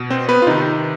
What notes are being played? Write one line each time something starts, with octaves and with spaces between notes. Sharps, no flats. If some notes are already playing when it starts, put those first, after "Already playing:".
Already playing: B2
C4 C5
B3 B4
F4
C3 D#3 D#4